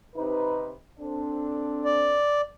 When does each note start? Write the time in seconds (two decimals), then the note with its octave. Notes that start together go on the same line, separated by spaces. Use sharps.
0.16 C3 D#4 B4
1.00 C4 D4 A4
1.85 D5